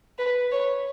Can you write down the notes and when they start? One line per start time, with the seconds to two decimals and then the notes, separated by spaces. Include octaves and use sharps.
0.18 B4
0.52 C#5